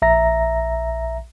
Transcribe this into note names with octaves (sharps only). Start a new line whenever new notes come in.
A#1 E5 A#5 A#6